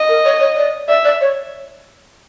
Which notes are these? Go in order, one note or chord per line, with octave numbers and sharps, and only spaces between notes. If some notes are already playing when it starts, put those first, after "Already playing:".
Already playing: D#5
A#4
C#5
C#5
D5
D5 E5
D5
C#5